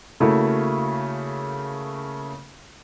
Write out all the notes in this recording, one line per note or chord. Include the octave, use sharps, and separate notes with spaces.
C#3 A3 A#3 E4 F#4